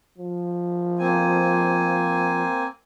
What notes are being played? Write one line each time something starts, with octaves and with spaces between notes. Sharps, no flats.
F3
A#3 C4 G#5